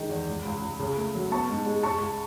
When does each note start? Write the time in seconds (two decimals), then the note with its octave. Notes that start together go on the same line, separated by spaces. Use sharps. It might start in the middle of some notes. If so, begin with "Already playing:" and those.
Already playing: D#3 G#3
0.10 E2
0.28 C#2
0.45 C#2
0.62 C#2
0.79 C#3
0.97 A3
1.15 F#3
1.31 B3 A5 C#6
1.49 G#2
1.66 G#3
1.83 G#3 A5 C#6
2.00 C#2